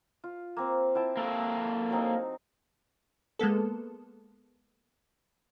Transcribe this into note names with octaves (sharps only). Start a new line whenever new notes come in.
F4
A#3 C4 C5
E4 G5 A5
A#3 A4
F#3 C4 D#4
G#3 A#3 B3 A4